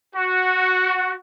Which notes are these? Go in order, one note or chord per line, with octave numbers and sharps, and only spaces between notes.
F#4